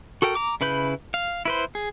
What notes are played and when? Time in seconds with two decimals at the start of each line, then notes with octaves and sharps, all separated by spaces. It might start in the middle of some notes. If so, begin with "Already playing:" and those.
0.22 F#4 A4 A#4 G5
0.35 A#5 D6
0.61 C#3 E4 B4 B5 G6
1.14 F5
1.45 E4 B4 C5
1.75 G#4